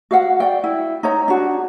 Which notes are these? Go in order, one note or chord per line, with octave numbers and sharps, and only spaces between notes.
F#4 F5 F#5
D5 G5
E4
D#4 C#5 A#5
D4 F#4